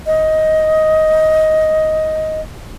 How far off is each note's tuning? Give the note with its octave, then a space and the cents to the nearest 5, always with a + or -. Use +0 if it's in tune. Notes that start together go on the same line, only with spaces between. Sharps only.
D#5 +10